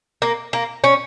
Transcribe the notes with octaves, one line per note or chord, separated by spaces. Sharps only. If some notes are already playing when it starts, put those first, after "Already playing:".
A#3
A#3
C#4